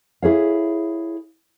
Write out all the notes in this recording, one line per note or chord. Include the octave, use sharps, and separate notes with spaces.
E4 G#4 C#5 F5